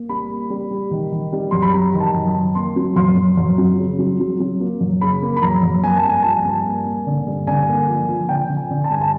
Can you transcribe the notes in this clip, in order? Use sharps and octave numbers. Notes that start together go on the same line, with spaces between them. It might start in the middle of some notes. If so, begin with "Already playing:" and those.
Already playing: A#3
G3 B5
A#3
G3
G3
D#3
D#3
G3
F#2 C6
B5
G3 A#5
D#3
A5
F#2
A5
D#3
A#3 C6
F#3
F#2 C6
F#2
F#2
F#3
C#3
F#3
F#3
F#3
A#3
F#2
C#3 B5
A#3
B5
F#2 A#5
F#2
A#3 G#5
A5
G2
G#5
F3 A5
G#5
G2 A5
A#3 G#5
A#3
D3
G2
D3 G#5
A#3
F3
F3
D3 G5
D3
G#5
D3
A5
G2 G#5
A5